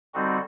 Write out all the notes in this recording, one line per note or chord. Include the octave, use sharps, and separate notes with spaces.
D3 G3 C4 D#4 F#4